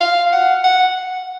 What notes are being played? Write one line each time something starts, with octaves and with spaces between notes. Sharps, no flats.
F5
F#5
F#5